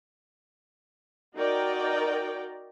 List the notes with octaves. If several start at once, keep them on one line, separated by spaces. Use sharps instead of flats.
D#4 F#4 A#4 D5 G5